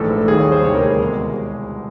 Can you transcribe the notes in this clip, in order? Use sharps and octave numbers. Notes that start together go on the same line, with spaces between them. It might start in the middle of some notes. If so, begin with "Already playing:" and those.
Already playing: A#1 G#2 E3 A3 A4
D#2 D#3 G3 G#4
C#5
C5
D2 C3 D#3 G3 C#5
A#4
G#4
C2 B2 G#3